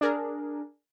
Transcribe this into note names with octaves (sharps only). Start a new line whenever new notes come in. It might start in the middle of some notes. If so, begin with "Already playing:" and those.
D4 G#4 A#4